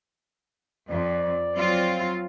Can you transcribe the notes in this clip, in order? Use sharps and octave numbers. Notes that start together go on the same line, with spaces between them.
F2 D5
F#3 C4 F4